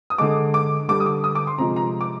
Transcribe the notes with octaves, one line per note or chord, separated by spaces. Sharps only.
D#6
D3 G#3 D6
D6
D3 G3 D6
D#6
D6
D#6
D6
C6
C3 F3 G#3 A#5
A#5
D6